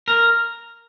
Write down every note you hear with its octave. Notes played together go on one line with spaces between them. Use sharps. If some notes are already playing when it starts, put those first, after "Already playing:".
A#4